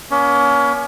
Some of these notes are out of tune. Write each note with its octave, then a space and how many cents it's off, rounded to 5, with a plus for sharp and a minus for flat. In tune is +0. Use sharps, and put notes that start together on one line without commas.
A#3 +45 C#4 +30